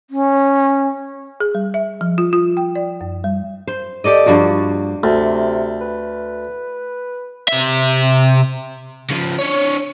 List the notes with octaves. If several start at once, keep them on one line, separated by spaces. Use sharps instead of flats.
C#4
G#4
G3
E5
F3
F4
F4
G5
D5
F#2
G3
C5
G4 A4 D5 D#5
G2 F3 A#3 F#4
D2 C3
B4
C3 E5
C#3 F3
D4 C#5